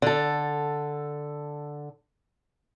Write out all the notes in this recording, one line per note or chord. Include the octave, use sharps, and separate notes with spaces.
D3 A4